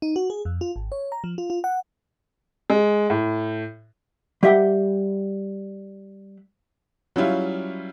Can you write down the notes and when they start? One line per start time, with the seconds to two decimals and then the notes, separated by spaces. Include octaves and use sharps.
0.02 D#4
0.16 F#4
0.30 G#4
0.45 F2
0.61 F4
0.76 G#1
0.92 C#5
1.12 A#5
1.24 F3
1.38 F4
1.50 F4
1.64 F#5
2.70 G#3
3.10 A2
4.43 G3 G4 E5 F#5 G5
7.16 F#3 G3 C#4 E4 F4